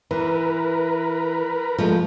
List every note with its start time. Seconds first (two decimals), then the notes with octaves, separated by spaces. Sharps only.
0.11 E3 A#4 B4
1.78 F3 G#3 A3